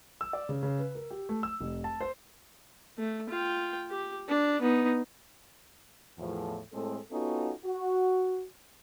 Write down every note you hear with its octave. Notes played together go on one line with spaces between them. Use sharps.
E6
D5
C#3
C#3
B4
A#4
G4
A3
E6
F1
A5
C5
A3
F4 G5
G4
D4
B3 D#4
E2 A2 F3
A2 G#3 C4 A4
B3 C#4 D#4 F4 F#4 A4
F#4